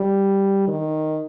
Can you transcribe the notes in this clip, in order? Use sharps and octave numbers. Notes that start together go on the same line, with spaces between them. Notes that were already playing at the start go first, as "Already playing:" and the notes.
Already playing: G3
D#3